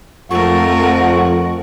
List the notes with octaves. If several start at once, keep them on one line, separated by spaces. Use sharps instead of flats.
F2 A3 A#4 F#5 C#6